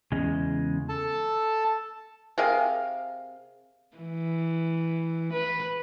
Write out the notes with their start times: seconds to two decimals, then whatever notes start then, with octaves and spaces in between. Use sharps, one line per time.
0.12 E2 C#3 G#3
0.89 A4 A5
2.38 C3 G#4 A#4 F5
3.97 E3
5.32 B4